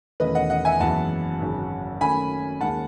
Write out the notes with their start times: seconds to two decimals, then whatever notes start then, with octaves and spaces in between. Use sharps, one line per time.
0.20 E1 E2 D#3 A3 C#4 B4 D#5
0.35 D#5 F#5
0.50 D#5 F#5
0.65 E5 G#5
0.80 F#1 F#2 E3 G#3 B3 F#5 A5
1.40 G#1 F#2 C#3
2.01 F#2 D#3 A3 C#4 G#5 B5
2.61 D#2 D#3 G#3 C#4 F#5 A5